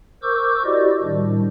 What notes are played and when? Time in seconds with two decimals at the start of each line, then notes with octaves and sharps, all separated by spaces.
0.23 A#4 C5 C#6 D6 E6 G6
0.64 E4 F#4 G4 C5 D5 D#5
1.02 A2 D#3 G3 D4